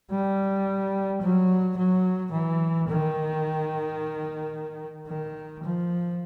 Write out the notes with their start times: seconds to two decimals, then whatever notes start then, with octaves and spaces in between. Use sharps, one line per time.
0.11 G3
1.22 F#3
1.77 F#3
2.32 E3
2.88 D#3
5.08 D#3
5.63 F3